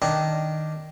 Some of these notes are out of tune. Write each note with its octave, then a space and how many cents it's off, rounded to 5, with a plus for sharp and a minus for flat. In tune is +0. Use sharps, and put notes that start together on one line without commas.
D#3 +0 D4 +0